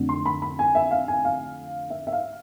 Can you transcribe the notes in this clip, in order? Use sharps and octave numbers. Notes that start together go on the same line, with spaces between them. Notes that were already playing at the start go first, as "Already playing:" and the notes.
Already playing: F2 D3 A3
C6
B5
B5
G#5
E5
F5
G#5
F5
E5
E5
F5